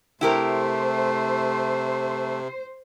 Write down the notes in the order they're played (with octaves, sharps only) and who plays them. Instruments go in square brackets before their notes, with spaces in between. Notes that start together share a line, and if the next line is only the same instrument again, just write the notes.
[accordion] C3 [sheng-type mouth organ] A3 [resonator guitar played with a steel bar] E4 G4 A#4 [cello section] C5